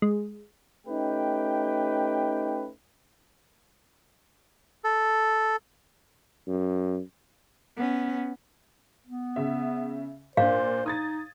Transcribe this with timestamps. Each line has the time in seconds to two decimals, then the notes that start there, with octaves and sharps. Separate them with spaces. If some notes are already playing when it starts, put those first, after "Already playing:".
0.02 G#3
0.86 A3 C#4 D#4 G4 B4 G5
4.84 A4
6.47 F#2
7.77 B3 C#4
9.08 B3
9.36 C#3 E5
10.37 A#2 D4 C5 F5
10.86 D#4 D#6 G#6 A6